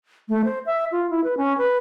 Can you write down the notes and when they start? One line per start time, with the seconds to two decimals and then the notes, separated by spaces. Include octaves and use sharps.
0.29 A3
0.44 C5
0.66 E5
0.92 F4
1.10 E4
1.24 B4
1.37 C#4
1.58 B4